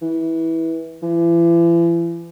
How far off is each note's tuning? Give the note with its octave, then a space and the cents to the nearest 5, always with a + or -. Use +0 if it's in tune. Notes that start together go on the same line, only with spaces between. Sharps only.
E3 -15
E3 +40